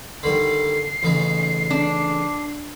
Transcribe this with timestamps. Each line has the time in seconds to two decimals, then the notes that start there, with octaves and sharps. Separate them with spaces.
0.23 D3 D#3 G3 C7
1.03 A1 C#3 D#4
1.70 D4